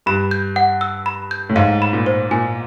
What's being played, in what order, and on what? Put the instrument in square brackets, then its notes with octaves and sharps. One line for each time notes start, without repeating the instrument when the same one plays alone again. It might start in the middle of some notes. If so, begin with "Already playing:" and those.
[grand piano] G2 [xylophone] B5
[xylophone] G6
F#5
E6
B5
G6
[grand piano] A2
[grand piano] G#2 [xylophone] F5
[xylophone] B5
[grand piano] A#2
[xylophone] C5
[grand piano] A#2 [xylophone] G#5